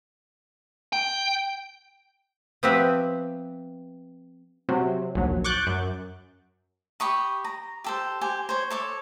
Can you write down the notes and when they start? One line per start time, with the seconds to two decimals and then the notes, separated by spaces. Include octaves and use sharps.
0.93 G5
2.63 F3 B3 C4 G4 B4 E5
4.69 C3 F#3
5.15 A#1 D#2 F#3
5.44 C#6 D6 F#6 G6 A6
5.67 F#2
7.00 G4 B5 C#6 D#6
7.45 A#5
7.84 G4 A4 C5
8.21 G4 C5 G#5
8.49 C5 C#5
8.70 A4 C#5 D6